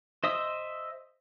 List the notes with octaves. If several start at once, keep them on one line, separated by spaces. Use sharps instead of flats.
C5 D#5 E5 D#6